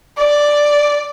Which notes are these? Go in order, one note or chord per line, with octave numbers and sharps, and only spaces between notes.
D5